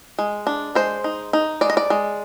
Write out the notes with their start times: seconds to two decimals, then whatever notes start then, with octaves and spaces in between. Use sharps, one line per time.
0.19 G#3
0.47 D4
0.75 G#3 C5
1.04 D#4
1.33 D#4
1.61 G#3 D5
1.70 D#5
1.77 D5
1.90 G#3